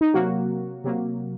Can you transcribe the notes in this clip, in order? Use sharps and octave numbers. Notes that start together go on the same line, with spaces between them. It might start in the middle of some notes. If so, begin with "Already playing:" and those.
D#4
C3 F#3 A#3 F#4
C3 F#3 A#3